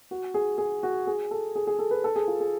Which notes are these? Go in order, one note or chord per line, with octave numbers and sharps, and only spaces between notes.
F#4
G#4
G#4
F#4
G#4
A4
G#4
G#4
A4
B4
A4
G#4
F4
G#4